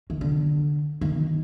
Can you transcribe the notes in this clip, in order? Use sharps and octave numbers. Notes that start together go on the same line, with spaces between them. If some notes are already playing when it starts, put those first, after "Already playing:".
D#3
D3
D#3